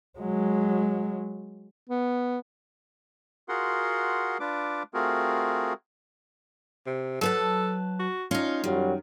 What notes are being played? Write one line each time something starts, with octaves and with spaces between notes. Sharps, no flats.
F#3 G#3
B3
F4 F#4 G#4 A#4 F#5 C6
D4 F4 B4 D6
A3 C4 F4 F#4 G#4 A#4
C3
F#3 A4 B4 A5
F#4
C#4 D#4 F4
F#2 D#3 F#3 G3